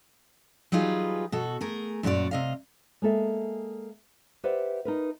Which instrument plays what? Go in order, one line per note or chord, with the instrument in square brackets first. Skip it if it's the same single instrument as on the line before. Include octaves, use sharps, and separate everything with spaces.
[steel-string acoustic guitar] F#3 G3 D#4 F4 G#4 B4
B2 F#4 A4
A3 G#4 A#4
F#2 A#2 F#4 C#5 D5
C3 D#5 F5
[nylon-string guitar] G#3 A#3 A4 E5
G4 B4 C5 D5 E5 F#5
D#4 A#4 B4